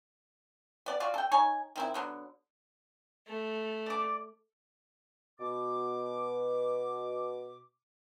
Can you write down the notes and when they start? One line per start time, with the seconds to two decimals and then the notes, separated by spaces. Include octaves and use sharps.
0.86 B3 D5
1.00 F4 F#4 D5
1.14 A4 G5
1.31 D#4 C#5 G#5
1.76 D#3 C4 E4
1.94 D3 F#3 B3
3.28 A3
3.86 D5 D6
5.40 B2 D6